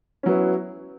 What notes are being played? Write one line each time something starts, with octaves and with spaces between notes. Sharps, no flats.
F#3 B3 C#4 E4